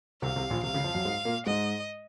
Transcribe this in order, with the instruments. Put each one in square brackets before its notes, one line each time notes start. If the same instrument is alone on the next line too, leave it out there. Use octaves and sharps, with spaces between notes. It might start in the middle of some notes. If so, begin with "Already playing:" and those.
[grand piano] C2 C3 [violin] F5
[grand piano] C2 C3
A#1 A#2
[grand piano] C2 C3 [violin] F5
[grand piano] C#2 C#3
F2 F3
F#2 F#3
G#2 G#3
A#2 A#3
[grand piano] G#2 G#3 [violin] D#5